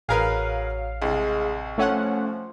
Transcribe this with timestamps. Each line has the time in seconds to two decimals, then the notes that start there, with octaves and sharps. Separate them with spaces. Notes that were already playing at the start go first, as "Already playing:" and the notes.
0.09 A1 F#3 G#4 A#4 B4 F5 C7
1.02 C2 G#3
1.78 F3 A3 C#4 F#5